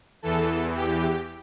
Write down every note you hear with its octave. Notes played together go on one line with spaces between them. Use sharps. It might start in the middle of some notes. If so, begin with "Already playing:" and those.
E2 E3 A4
G4